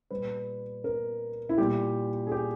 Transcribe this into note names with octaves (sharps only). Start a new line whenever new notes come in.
A#2 G3 B4
A#4
E4
A#2 G3 G4
G#4
G4